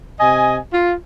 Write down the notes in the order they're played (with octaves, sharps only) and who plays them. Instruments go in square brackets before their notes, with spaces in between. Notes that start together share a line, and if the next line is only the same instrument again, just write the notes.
[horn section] C3 D#5 G#5
F4